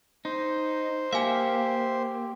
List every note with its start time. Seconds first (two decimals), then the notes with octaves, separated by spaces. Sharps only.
0.25 D#4 C5
1.13 A#3 G4 E5 F5 G#5